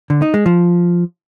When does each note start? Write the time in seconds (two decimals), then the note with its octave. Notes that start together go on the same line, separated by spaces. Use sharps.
0.10 D3
0.22 D#4
0.34 G#3
0.46 F3